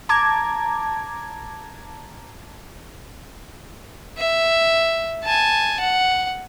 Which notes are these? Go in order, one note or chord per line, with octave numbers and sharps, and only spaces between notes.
A5 A#5 D6 G#6
E5
G#5 A5
F#5